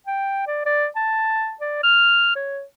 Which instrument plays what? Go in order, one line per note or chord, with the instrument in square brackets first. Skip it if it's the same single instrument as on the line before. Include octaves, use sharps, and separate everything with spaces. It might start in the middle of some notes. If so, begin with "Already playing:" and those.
[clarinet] G5
D5
D5
A5
D5
F6
C#5